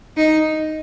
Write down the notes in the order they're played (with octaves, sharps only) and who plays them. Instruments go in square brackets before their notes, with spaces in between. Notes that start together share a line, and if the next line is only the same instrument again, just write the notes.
[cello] D#4